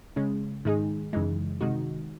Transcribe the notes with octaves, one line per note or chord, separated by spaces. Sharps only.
C#3 G#3 C#4
G#2 D#3 G#3 D#4 G#4
F#2 C#3 E3 G#3 D#4
C3 D#3 G#3 D#4 F#4